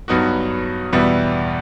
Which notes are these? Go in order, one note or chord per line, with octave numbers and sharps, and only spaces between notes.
G2 F#3 B3 D#4 F#4
E2 B2 G3 B3 E4